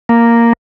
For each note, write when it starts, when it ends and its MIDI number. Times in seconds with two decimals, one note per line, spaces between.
0.09 0.53 58